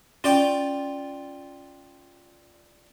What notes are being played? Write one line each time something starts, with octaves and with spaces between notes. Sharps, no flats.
C#4 F4 D5 G5